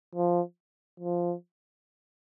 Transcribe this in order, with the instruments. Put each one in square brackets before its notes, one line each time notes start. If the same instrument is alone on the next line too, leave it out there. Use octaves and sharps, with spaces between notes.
[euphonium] F3
F3